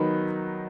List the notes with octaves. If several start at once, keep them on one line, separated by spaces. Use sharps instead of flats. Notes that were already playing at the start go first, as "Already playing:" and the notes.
Already playing: D#3 F#3 B3 D#4 B5